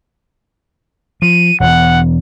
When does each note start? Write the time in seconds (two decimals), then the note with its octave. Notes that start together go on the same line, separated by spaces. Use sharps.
1.22 F3 D#7
1.60 E1 E2 F#5